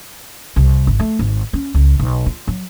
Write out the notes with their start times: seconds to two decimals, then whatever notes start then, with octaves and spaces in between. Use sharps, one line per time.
0.56 C2
0.87 G#1
1.00 A3
1.19 G#1
1.53 C#4
1.74 C#2
1.99 B1
2.26 F4
2.48 F#3